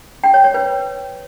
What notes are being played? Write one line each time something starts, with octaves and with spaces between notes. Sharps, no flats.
G5
C#5
C#5
B4